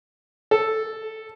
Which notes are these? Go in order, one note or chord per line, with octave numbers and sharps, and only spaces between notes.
A4